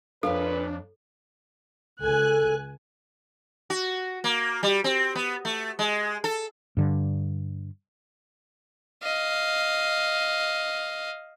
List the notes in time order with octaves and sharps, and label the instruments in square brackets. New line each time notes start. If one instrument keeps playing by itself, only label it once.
[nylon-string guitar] F2 C#5 F5 [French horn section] A#2 B4 [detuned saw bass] D4 [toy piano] A4
[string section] C#2 G#5 F#6 [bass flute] A4
[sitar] F#4
A#3
G3
C4
B3
A3
G#3
A4
[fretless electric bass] G2 D3
[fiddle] D#5 F5